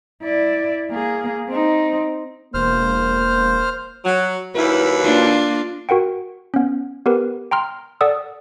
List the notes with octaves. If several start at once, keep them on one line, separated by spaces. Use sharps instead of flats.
E4 D5
A#3 G#4
C4 D#4
E1 A#3 C5 F6
F#3
D#2 F#3 E4 B4
A#3 D4 F4
F#4 A#4 F#5 G5
B3 C#4
B3 G4 A#4 B4
G5 A#5 C6 F6
A4 D5 F#5 D#6 E6